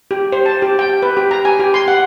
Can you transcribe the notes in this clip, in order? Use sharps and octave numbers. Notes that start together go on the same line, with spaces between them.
G4
C5
A5
G4
G5
B4
G4
A#5
G#5
G4
C6
F#5